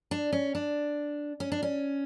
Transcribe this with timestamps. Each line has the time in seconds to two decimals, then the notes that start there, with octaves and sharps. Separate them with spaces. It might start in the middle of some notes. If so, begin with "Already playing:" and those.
0.11 D4
0.33 C#4
0.55 D4
1.40 C#4
1.52 D4
1.63 C#4